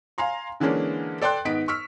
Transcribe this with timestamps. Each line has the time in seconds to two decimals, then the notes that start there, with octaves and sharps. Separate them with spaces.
0.18 F5 G#5 A#5 C6
0.60 D3 E3 G#3 A#3 C#4 D4
1.22 A4 D5 G5 C6 F#6
1.45 G#2 D#3 B3 D#4 B6 D7
1.68 C#6 E6 F6 B6